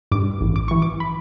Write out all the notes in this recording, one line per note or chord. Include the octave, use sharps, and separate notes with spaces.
G2 D6
A1
D6
E3 C#6
D6
B5